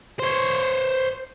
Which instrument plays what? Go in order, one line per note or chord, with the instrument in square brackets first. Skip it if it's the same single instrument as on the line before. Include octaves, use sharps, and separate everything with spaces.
[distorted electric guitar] C5 C#5